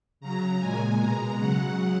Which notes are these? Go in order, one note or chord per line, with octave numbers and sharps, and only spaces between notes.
C#3 F#3 A#5
A#2 G#3 G#5
B2 G#3 A#5
C#3 F#3 F#5